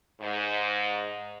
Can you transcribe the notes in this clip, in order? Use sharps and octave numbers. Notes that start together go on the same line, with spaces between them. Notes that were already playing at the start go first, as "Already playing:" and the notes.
G#2